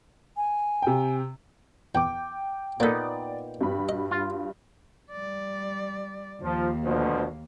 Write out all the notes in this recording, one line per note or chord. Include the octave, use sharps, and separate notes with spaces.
G#5
C3 G5
E2 G5 D6
A#2 A#3 B3 D#4 A4 D5
G2 F#4 B5
D#5
F4
G3 D5
D#2 F3 A#3
D2 B2 F3